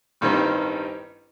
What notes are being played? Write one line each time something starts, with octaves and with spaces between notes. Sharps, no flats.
A1 G2 D#3 G3 C4